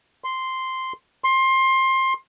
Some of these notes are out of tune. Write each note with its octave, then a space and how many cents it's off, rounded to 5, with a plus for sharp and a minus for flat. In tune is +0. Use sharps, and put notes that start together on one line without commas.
C6 -5
C6 +20